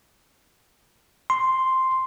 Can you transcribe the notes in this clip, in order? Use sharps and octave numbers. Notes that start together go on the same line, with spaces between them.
C6